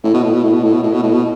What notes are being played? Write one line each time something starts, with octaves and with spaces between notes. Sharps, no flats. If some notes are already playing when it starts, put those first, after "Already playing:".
A2
B2
A2
B2
A2
B2
A2
B2
A2
B2
A2
B2